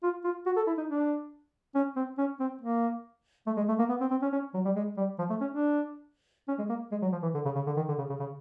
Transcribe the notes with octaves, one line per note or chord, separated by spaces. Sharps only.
F4
F4
F#4
A4
E4
D#4
D4
C#4
C4
C#4
C4
A#3
A3
G#3
A3
A#3
B3
C4
C4
C#4
C#4
F#3
G3
G#3
G3
F3
A3
C#4
D4
C#4
G#3
A#3
G#3
F#3
F3
E3
D3
C#3
C#3
D3
D#3
D3
C#3
C#3
C#3